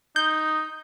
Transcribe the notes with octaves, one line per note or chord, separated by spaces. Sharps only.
D#4 G6